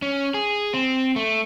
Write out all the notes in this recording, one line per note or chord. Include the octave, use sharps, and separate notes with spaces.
C#4
G#4
C4
A3